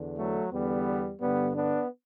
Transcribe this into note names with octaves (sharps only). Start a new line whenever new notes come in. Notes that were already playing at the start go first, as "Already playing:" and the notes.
Already playing: E2 D3
F#3 A3
E2 D3 G3 B3
G2 D3 G3 B3
B3 D4